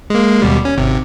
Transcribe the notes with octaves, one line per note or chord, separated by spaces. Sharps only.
G#3 A#3
D#2 B2 G3
C#4
G#1 C3